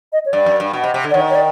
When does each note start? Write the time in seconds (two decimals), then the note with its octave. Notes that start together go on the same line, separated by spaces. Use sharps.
0.13 D#5
0.26 C#5
0.33 G2 D5
0.46 F#2
0.60 G2
0.73 B2
0.84 C3
0.94 C3
1.04 D3
1.11 D5
1.14 D#3 C#5
1.30 C#5
1.35 D5